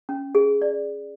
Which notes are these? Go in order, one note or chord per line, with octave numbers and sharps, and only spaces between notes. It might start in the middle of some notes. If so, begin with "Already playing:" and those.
C#4
G#4
D5